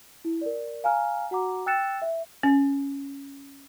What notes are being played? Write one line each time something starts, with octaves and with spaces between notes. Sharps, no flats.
E4
A#4 D5
F5 G#5 A#5 F6
F#4 F#5 A#5 D6
G5 E6 F#6 A6 C#7 E7
E5
C#4